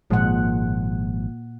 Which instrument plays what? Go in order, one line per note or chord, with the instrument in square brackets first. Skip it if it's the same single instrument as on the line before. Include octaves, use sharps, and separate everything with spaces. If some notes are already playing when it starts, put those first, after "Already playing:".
[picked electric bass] G#1 F3 G#3 [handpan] A#2 F#5